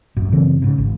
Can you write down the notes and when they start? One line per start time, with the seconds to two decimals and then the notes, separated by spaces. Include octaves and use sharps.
0.17 G1 F#2
0.32 F#2 C#3 E3 C4
0.62 G#2 C#3
0.78 G#1